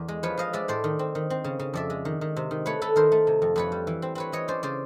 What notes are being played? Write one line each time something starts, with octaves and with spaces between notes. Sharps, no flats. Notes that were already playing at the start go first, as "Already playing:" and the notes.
Already playing: E2 D5
G#3
F3 B4 C#5
F3 D#5 F5
G#3 D5 E5
A2 C5 D5
D#3
C4
D#3
C4
C#3
C#3
F2 D5 E5
G#3
D#3
D#3
C3
D#3
A3 B4 C#5
A3 A4 B4
D#3 A#4 C5
A3
C3
F2
F2 B4 C#5
G3
E3
C4
C4 B4 C#5
E3 C#5 D#5
C#4 C5 D5
C#3 C5 D5